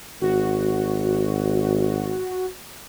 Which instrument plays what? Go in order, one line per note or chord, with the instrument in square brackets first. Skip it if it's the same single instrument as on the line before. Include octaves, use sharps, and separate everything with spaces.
[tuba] G#1 [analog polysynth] F#4